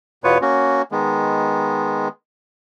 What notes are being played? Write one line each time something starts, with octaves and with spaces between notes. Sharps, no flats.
E2 B2 B3 F4 B4 C#5
A#3 C#4 F#4
D#3 G#3 B3